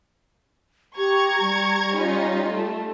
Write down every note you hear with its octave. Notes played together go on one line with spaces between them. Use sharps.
G4 A#5 C#6 G#6
G3
C#4 D#4 F4
A3